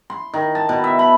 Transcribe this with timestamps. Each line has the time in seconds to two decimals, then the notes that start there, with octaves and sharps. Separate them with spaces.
0.10 C6
0.33 D#3
0.55 A5
0.69 B2
0.84 E5
0.99 B5